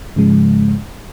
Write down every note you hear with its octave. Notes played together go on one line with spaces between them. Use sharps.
G#2 C#3 F3 G#3